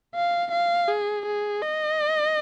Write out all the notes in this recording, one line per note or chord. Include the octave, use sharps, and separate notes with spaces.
F5
F5
G#4
G#4
D#5